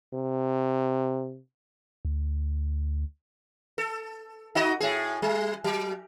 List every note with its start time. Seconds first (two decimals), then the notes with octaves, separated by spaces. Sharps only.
0.13 C3
2.05 D2
3.78 A4
4.55 D#4 F#4 D#5
4.80 A2 G#4
5.22 G3
5.64 F#3